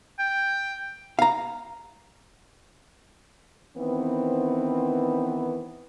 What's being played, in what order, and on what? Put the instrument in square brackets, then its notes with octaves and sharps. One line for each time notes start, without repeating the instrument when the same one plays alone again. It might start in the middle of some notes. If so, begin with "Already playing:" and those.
[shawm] G5
[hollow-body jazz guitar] F5 A#5
[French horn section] D#3 E3 B3 C4